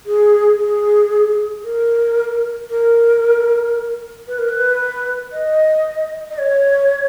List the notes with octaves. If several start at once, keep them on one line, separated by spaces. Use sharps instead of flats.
G#4
G#4
A#4
A#4
B4
A#4
B4
D#5
D#5
C#5